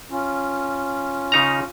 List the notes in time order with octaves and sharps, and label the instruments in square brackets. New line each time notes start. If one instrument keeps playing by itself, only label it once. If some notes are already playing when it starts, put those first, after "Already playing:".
[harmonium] C#4 F4
[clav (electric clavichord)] C#3 D#4 A#5